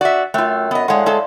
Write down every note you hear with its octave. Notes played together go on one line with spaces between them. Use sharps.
F#4 D5 E5
F#2 A3 F4 G5 E6 F#6
B3 D#5
A2 G#3 D5 F5 F#5 C6
G#3 A4 A5